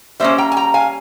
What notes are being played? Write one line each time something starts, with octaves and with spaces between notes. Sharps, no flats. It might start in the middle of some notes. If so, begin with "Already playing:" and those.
G3 A#3 C#4 C5 E5
G5 A#5
G#5
G5 A#5
F5 G#5